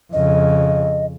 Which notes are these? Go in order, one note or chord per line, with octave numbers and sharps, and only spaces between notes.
F2 C#3 D#5